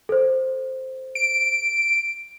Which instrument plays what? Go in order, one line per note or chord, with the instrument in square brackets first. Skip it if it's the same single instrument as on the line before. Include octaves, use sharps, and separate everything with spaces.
[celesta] A4 C5
[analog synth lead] D7